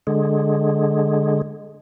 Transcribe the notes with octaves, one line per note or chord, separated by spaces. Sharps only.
D3 G#3